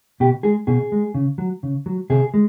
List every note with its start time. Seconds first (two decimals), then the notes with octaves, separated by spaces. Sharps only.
0.20 B2 G4
0.43 G#3 G#4
0.67 B2 G#4
0.92 G#3
1.14 C#3
1.38 F#3
1.63 C#3
1.86 F#3
2.10 C3 G#4
2.34 G#3